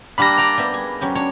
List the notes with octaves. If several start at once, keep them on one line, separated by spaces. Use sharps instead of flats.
G3 A#3 D4 B5 A#6
D5 G5 A#5
G3 B3 E5
G#4
F#3 C#4 G4
D4 C#5